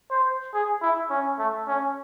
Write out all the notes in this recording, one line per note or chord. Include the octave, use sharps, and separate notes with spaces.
C5
G#4
E4
C#4
A3
C#4